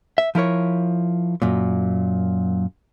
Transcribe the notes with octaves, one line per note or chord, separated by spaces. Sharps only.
E5
F3 E4 A#4 C#5
F#2 A#2